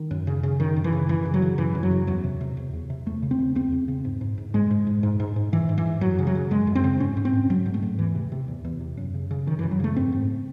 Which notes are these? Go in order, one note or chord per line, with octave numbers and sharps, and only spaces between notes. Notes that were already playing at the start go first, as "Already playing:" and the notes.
Already playing: D#3
F#2
C#3
C#3
F#2 D#3
F#2
E3
C#3
F#2 E3
C#3
F#3
C#3
F#2 E3
F#2
F#3
C#3
E2 F#3
C3
C3
E2
E2
C3
E2 A3
C#3
C4
C#3
E2 C4
E2
C#3
G#2
G#2
G#2
G#2 G#3
G#2
G#2
G#2
G#2
G#2
G#2 E3
G#2
E3
G#2
F#2 F#3
C#3
F#3
C#3
F#2 G#3
F#2
C4
C#3
G#2 C#4
G#2
C4
G#2
G#2 F#3
G#2
A3
G#2
E2 E3
C3
C3
E2
E2
C3
F#2
C#3
C#3
F#2 D#3
F#2 E3
F#3
C#3 A3
G#2 C4
G#2